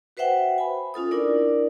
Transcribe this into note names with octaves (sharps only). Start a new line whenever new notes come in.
F#4 B4 C5 E5 F#5 G5
G#5 B5
C#4 F4 A4 D#6
D4 E4 A#4 D5